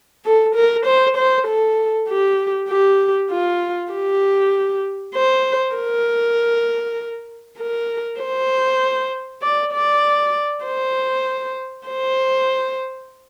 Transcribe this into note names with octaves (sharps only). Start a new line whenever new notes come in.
A4
A#4
C5
C5
A4
G4
G4
F4
G4
C5
A#4
A#4
C5
D5
D5
C5
C5